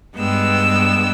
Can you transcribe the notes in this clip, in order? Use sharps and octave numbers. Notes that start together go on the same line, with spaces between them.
G2 G#3 B3 G5 E6